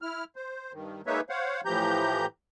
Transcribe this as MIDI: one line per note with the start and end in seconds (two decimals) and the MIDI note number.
0.02 0.24 64
0.02 0.24 89
0.36 0.72 72
0.73 1.01 43
0.73 1.01 51
1.07 1.21 56
1.07 1.21 58
1.07 1.21 63
1.07 1.21 71
1.07 1.21 73
1.07 1.21 76
1.29 1.61 72
1.29 1.61 73
1.29 1.61 77
1.29 1.61 78
1.65 2.26 45
1.65 2.26 52
1.65 2.26 53
1.65 2.26 67
1.65 2.26 82
1.65 2.26 91